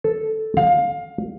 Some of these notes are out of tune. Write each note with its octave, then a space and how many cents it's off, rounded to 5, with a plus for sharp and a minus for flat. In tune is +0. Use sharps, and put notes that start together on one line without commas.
A4 -5
F5 +20